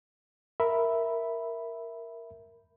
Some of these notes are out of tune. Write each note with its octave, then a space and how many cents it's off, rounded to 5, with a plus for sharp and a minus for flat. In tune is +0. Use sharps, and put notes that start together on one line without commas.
A#4 +0 E5 +0 B5 +0